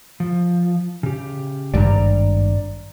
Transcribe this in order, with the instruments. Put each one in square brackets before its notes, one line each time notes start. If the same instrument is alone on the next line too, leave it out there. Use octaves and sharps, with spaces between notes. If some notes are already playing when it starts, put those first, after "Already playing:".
[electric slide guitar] F3
C#3 G4
[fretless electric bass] G#1 G2 [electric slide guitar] D5 A#5